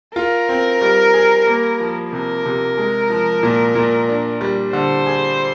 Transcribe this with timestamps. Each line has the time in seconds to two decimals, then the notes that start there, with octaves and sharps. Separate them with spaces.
0.16 F4 A#4
0.49 C4
0.81 G3
1.14 G#4
1.47 A#3
1.80 F3
2.12 C3 A#4
2.46 C3
2.78 G#3
3.10 F3
3.43 A#2
3.75 A#2
4.09 D4
4.41 G3
4.73 D3 C5
5.07 G#4